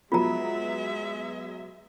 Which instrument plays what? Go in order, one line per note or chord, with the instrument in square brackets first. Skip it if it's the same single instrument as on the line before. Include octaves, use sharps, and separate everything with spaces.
[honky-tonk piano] F#3 B3 [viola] G#3 E5 [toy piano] F4 A#5